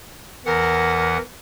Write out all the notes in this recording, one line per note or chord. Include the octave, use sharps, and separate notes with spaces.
E2 E3 A#4 F#5